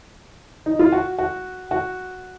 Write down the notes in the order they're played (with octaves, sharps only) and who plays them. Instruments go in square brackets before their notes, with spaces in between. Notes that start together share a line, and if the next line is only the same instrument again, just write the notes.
[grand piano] D#4
F4
F#4
F#4
F#4